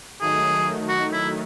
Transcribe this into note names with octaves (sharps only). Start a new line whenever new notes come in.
D#3 F#3 A3 D#4 G#4
F#4
E4